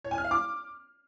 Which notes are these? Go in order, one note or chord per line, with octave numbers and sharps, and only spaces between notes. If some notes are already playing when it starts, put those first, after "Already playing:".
C#5
G#5
F6
F5
D6